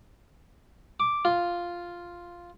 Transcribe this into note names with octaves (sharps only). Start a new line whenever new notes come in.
D6
F4